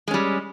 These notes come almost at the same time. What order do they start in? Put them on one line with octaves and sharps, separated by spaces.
G#3 C#4 G3